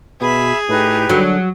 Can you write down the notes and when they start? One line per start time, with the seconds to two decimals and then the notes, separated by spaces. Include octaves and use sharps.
0.21 B2 G#4 E5 B5
0.69 A2 D#4 G4 B4
1.09 D3 F#3